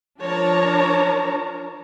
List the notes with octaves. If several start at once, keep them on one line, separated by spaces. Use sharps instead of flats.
F3 D4 A#4 C#5 A5 A#5